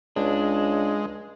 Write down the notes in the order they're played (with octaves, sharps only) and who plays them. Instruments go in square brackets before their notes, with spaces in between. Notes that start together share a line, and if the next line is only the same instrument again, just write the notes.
[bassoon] C#2 [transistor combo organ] G#3 [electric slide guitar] D4